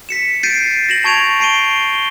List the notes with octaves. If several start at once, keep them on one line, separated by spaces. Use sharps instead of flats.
B6 C#7 E7
G6 A6 C7 D7 D#7
A#6 E7 F#7
A5 C#6 G#6 D7 F7
A5 C7 D7 D#7 G7
G7